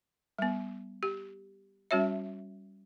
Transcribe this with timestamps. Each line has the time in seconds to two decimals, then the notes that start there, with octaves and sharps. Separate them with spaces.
0.39 G3 B3
1.03 G4
1.91 G3 C#4 F#4 C#5 E5